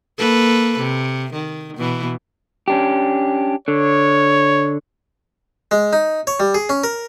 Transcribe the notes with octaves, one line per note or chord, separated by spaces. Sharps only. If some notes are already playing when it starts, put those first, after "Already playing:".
A#3 A4 B4
C3
D#3
B2 E3
C#4 D4 G4
D3 C#5
G#3
D#4
C#5
G3
G#4
C#4
A#4